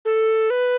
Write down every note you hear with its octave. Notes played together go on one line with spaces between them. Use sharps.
A4
B4